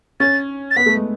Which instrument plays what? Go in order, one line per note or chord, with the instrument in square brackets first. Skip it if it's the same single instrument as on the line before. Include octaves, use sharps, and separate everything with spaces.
[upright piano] C#4 [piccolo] A6
[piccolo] A6
[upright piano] B3 [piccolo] B6
[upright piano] A3
G#3